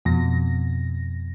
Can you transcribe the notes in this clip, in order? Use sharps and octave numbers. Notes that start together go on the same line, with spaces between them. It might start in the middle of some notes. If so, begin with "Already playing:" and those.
F2 B2 A#6